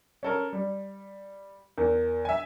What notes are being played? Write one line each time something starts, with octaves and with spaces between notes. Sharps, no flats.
C#4 A4 A#4
G3
E2 A#4
E5 G#5